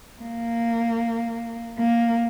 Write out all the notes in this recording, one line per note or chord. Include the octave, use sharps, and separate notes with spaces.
A#3
A#3